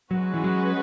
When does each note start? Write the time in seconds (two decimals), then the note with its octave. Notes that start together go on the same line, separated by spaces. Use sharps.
0.11 F#3 G#3 C#4 F#4 B4
0.34 E3
0.44 F#3